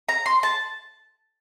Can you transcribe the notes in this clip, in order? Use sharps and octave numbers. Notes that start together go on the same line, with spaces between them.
A#5
C6
A5